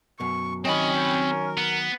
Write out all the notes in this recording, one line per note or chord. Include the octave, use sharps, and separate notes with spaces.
F#2 B2 C#6
D#3 F#3 C4 C#4 D#5 B5
G5
A#4
B3